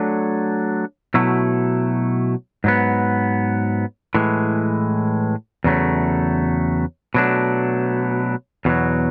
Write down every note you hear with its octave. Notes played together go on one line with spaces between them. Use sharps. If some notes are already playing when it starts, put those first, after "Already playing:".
Already playing: F#3 A3 D4 A4
B2 F#3 A3 E4
G#2 F#3 B3
A2 E3 G#3
E2 C#3 F#3 A3
B2 F#3 A3 D4
E2 B2 F#3